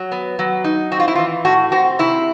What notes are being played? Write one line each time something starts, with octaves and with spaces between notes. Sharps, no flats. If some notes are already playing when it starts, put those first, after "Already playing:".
Already playing: F#3
B3
F#3
D#4
C4 F#4
F4
E4
E3 F4
A2 F#4
C4 F#4
C3 E4